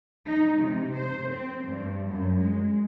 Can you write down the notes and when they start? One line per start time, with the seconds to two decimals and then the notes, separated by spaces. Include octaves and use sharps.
0.26 D#4
0.59 C3
0.97 C5
1.30 C4
1.64 G2
2.07 F#2
2.40 G#3